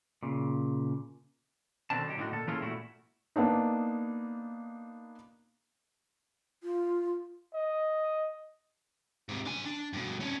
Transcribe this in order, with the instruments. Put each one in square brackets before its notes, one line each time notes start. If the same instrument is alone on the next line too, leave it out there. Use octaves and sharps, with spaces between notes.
[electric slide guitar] A#2 C#3
B2 D3 D#3 C4 D4 A5
F#3 D#4 G4
A2 D3 G3 B3 D#4 F#4
A#2 A4
E3 A#3 C#4 F4 G#4 A4
A#2 A3 E4 F#4
[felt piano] A#3 B3 D4 D#4
[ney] F4
[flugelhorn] D#5
[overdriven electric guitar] G#2 C3
D4 G#5
D4
G2 B2
C#4 D4